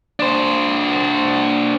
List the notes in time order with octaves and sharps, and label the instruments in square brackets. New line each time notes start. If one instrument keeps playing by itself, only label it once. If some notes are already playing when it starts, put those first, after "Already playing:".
[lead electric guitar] D4 C5